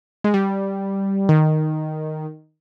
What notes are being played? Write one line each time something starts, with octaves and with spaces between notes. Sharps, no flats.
G#3
G3
D#3